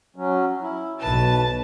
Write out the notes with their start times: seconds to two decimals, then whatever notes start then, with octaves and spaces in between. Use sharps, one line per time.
0.16 F#3 C#4
0.61 E4
1.01 B1 B2 B4 A5